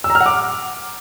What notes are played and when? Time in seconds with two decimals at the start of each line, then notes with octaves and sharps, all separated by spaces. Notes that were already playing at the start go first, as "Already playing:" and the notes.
0.04 E6
0.10 A#5
0.15 F6
0.20 F#5
0.26 D6